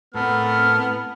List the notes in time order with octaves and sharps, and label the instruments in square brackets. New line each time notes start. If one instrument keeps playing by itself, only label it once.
[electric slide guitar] A2 C4 [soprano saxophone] B3 [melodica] A4 A#4 [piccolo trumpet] F6